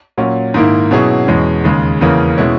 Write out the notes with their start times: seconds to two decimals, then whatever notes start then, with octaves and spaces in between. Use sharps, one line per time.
0.17 A#2 F#3 C#4
0.54 G#2 D#3 A#3 E4
0.91 B2 F#3 C#4 E4 G#4
1.27 E2 B2 G#3 C#4
1.64 D#2 C#3 G#3
2.01 E2 C#3 E3 A#3 C#4
2.37 B2 G#3 C#4 E4